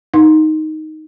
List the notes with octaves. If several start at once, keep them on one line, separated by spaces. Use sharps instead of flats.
D#4